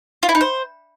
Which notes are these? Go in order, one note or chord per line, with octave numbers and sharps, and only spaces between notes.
F4
E4
D#4
C5